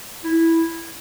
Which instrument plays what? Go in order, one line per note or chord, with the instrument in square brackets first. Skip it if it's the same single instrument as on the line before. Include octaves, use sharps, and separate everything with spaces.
[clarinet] E4